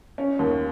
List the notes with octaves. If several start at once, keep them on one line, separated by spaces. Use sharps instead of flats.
C#4
D#2